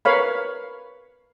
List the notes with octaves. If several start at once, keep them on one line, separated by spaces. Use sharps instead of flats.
A#4 B4 C#5 F5 B5